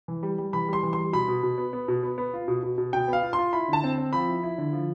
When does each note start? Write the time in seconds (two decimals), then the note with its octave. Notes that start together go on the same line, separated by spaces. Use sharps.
0.08 E3
0.23 G3
0.38 G3
0.53 E3 B5
0.68 G3 C6
0.83 E3
0.93 C6
0.98 G3
1.13 B2 B5
1.28 B2
1.43 B2
1.58 B3
1.73 B3
1.88 B2
2.03 B3
2.18 B3
2.34 F4
2.48 B2
2.63 B2
2.78 B2
2.93 B2 G5
3.08 B3 F5
3.23 F4
3.33 C6
3.38 F4
3.53 E4 B5
3.68 D3 A5
3.84 C4
3.98 C4
4.13 F3 B5
4.28 E4
4.43 E4
4.58 D3
4.73 F3